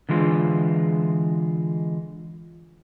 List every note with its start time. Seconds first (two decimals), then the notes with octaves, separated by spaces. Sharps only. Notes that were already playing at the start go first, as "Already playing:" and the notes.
0.09 D3 E3 G#3 F4